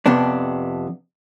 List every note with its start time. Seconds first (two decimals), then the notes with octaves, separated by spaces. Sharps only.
0.06 F2 C3 B3 D4